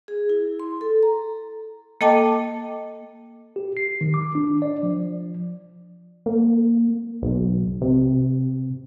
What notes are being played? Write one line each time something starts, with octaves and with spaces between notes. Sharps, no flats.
G#4
E4
C6
A4
A#5
A#3 A4 D#5 G5 A5 D6
G4
C7
D#3
D6
D4
D5
F3
A#3
B1
C3